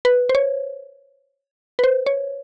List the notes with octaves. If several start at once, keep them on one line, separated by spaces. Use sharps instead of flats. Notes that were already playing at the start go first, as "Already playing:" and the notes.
B4
C5
C#5
B4
C5
C#5